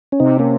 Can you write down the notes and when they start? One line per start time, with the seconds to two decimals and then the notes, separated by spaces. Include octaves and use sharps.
0.12 C#4
0.20 C3 C4 D#4
0.39 A#3 C#4